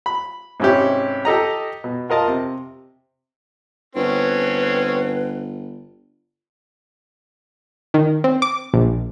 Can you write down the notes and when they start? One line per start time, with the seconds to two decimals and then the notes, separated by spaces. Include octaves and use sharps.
0.06 B5
0.60 G#2 C3 C#4 E4 G4
1.25 G4 A4 D#5 A#5
1.84 B2
2.10 F4 A#4 D#5 A5
2.28 C3
3.95 G1 C4 C#4 B4
7.94 D#3
8.24 C4
8.42 D6
8.74 A#1